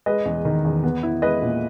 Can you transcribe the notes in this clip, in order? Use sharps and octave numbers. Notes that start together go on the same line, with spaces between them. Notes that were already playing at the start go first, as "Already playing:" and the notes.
G#3 B4 D#5
E2
D#3
E2
B3
E4
G#3 B4 D#5
A#2